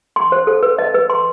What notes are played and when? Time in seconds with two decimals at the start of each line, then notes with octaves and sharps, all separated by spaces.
0.16 C6
0.32 C5
0.47 A4
0.63 B4
0.78 D#5
0.95 B4
1.10 C6